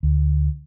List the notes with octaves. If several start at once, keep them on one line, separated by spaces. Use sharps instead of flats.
D2